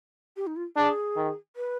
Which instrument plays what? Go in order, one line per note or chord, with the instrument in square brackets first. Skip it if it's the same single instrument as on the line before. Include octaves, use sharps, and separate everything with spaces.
[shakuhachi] G4
D#4
F4
[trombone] D4 [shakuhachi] G#4
[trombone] D#3
[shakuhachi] B4